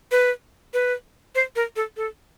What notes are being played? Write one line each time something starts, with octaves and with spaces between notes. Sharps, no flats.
B4
B4
C5
A#4
A4
A4